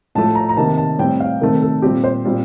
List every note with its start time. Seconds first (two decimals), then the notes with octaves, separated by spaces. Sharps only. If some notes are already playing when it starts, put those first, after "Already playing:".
0.15 A2 F3 A3 A5
0.35 A#5
0.49 A#5
0.57 C3 D#3 A#3 A5
0.78 A5
0.99 A2 G3 C4 G5
1.20 F5
1.41 C3 D#3 A3 C4 A#4
1.62 A4
1.82 A#2 G3 C4 G4
2.04 C5
2.25 A#2 G3 C4